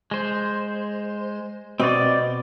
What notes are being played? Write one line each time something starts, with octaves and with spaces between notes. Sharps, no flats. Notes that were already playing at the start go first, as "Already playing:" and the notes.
G#3 C5
B2 C4 D5 D#5